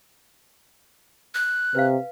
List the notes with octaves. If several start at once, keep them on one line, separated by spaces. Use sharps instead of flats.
F#6
C3 B4 F5